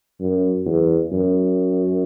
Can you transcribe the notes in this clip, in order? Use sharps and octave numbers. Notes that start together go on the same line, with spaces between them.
F#2
E2
F#2